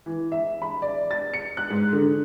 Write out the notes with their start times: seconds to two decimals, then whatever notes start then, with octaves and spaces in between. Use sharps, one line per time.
0.06 E3
0.32 E5
0.62 B5
0.82 D5
1.11 A6
1.34 C#7
1.57 F#6
1.70 G#2
1.92 D3